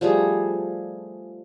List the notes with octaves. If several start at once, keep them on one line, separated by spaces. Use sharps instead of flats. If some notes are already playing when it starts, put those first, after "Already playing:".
F3 G3 A3 G#4